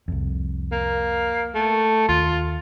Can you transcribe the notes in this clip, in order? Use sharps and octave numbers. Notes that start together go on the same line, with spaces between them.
C2 F2
A#3
A3
D#2 F4